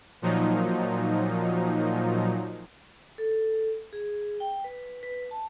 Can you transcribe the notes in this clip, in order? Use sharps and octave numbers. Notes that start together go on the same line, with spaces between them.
A#2 F3 F#3 D#4
A4
G#4
G5
B4
B4
A5